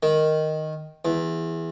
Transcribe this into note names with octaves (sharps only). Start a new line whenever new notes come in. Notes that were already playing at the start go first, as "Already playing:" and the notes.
D#3
E2